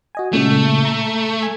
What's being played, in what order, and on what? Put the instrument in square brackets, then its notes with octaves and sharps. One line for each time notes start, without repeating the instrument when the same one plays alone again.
[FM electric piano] F#4 D#5 G#5
[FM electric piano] A#2 C#3 G#3 [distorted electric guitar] A3
[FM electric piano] A#5
G#5